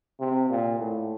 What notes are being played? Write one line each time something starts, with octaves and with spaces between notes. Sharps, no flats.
C3
A#2
A2